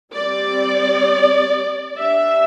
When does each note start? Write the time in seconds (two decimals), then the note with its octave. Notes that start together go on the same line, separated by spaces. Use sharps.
0.12 G3 C4 D5
1.96 G3 D4 E5